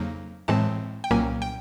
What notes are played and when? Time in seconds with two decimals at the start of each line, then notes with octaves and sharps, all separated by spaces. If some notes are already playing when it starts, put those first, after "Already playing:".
Already playing: F2 C#3 F#3 A#3 D#4
0.48 A2 E3 G#3 C4 A5
1.04 G5
1.11 C2 A#2 F#3 A#3 C#4 G#5
1.42 G5